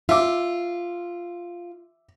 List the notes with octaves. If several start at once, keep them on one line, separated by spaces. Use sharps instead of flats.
F4 E5 D6